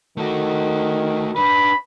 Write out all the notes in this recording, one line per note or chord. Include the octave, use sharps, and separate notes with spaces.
D#3 A3 F#4
D4 B4 B5